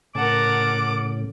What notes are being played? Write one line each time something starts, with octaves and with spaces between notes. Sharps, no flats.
A2 C#3 A#4 F#5 A5 D6